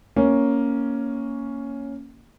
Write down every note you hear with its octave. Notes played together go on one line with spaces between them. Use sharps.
A#3 C#4